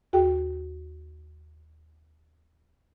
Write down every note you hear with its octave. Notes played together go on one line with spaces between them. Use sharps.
D#2 F#4 G#4 G5